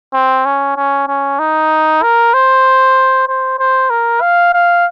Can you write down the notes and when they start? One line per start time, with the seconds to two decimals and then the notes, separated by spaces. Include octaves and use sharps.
0.13 C4
0.45 C#4
0.76 C#4
1.08 C#4
1.39 D#4
2.02 A#4
2.34 C5
3.28 C5
3.59 C5
3.90 A#4
4.21 F5
4.53 F5